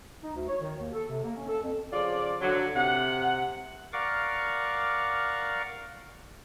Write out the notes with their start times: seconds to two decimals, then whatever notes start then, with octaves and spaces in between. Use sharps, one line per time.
0.23 D#4
0.35 D2
0.48 C#5
0.62 D#3
0.80 D#2
0.93 A4
1.10 C3
1.24 A#3
1.36 C#4
1.48 A4
1.63 F2
1.93 C#3 F3 F4 D5
2.41 D3 F#3
2.76 C3 F#5
3.93 A#4 D5 F5 F#5 C#6 D6